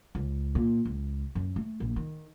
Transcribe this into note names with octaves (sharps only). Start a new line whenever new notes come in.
C#2
A#2
C#2
F#2
A3
A#1
D#3